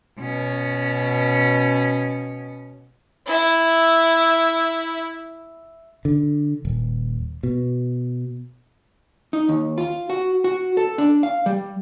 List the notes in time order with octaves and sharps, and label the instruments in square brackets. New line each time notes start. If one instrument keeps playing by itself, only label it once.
[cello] B2 C#4
[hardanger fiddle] E4 E5
[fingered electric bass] D3
D#1
B2
[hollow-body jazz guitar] D#4
D#2
F4
F#4
F#4
A4
D4
F5
G3